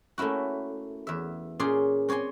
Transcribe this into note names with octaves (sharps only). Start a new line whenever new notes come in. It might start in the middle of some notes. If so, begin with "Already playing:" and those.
A3 A#3 C#4 E4 F#4
E2 E5
A#2 C#4 G#4 D5 C6
C4 C#5 D5 G#5 C6